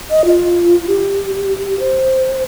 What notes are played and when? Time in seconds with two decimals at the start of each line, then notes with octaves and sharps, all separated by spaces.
0.11 D#5
0.25 F4
0.87 G4
1.80 C5